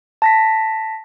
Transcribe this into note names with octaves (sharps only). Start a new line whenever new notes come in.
A5 A#6 B6